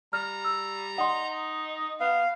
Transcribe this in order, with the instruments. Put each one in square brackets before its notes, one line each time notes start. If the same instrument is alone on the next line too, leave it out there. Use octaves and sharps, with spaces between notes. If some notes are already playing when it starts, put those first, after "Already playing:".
[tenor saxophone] G3 [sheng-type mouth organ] A#5 [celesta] F6
[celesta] E6
[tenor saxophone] D#4 [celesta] F#5 C6
[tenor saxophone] B3 [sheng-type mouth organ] F5